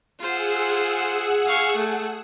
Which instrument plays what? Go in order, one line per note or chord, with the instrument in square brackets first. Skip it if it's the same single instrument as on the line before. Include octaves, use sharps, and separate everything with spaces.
[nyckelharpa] F4 C5 [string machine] G#4 F#5 E6
[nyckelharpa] F5 C#6
A3